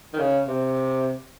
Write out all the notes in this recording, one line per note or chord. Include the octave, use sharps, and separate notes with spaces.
D#3
C#3
C3